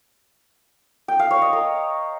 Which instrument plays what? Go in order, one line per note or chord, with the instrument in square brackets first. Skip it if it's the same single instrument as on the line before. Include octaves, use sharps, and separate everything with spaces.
[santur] G5
F5
C#5
D#5
A#4